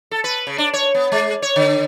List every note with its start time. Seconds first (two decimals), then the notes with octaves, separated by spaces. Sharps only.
0.11 A4
0.24 B4
0.47 C#3
0.58 D4
0.73 C#5
0.95 B3
1.12 G#3
1.42 C#5
1.56 D3